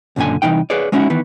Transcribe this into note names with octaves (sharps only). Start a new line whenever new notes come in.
C#2 F#2 A#2 D3 G#5
C2 C3 E3 D#4 G5
G#4 B4 C#5 D5
G#3 B3 C#4 D#4 E4 F#4
D#3 E3 B3